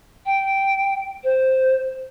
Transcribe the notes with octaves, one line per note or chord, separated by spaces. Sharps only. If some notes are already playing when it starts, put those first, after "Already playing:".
G5
C5